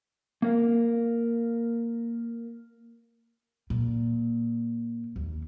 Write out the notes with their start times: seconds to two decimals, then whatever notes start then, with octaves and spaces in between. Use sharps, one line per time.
0.42 A#3 A#4 F5
3.70 A#2
5.16 D#2